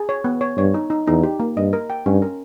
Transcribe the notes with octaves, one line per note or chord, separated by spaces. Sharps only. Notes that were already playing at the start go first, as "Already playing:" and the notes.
Already playing: G#4
C#5
B3
C#5
G2 C#5
D#4
D#4
E2 D#4
G4
A#3
G2 D#5
A#4
G5
G2 C#4
A#4